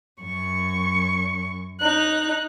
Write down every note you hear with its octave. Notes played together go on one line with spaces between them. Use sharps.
F#2 C#6
D#4 F#6